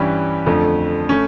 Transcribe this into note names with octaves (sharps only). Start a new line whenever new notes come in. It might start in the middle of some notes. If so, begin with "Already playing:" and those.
Already playing: G2 E3 G3 C#4 G4
F2 D3 F3 A3
A3 C#4